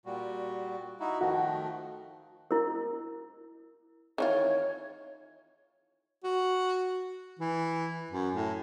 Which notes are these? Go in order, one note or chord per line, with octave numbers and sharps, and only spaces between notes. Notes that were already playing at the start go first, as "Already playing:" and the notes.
A#2 G3 F#4
D#4 E4 F#4
D#3 F3 A3 F#4
E4 A#4
D#3 E3 F4 C#5
F#4
E3
F#2
A2